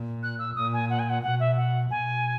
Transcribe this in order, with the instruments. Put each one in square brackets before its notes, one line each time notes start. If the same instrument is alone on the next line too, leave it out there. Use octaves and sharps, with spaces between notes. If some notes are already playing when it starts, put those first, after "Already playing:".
Already playing: [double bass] A#2
[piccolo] F#6
E6
[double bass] A#2 [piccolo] D#6
[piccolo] G#5
F#5
G#5
F#5
[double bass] B2 [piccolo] F#5
[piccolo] E5
F#5
[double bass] B2 [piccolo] G#5